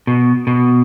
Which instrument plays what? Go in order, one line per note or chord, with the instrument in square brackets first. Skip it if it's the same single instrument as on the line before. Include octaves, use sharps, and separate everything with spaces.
[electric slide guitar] B2
B2